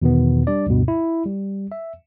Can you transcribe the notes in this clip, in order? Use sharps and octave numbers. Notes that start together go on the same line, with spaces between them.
E2 B2 D#3 B3
G3 D4 D5
D2 G2 B2
E4
G3
E5